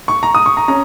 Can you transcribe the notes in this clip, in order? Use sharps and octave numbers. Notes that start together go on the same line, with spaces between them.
C#6
A#5
D#6
C#6
A#5
C#4 A#5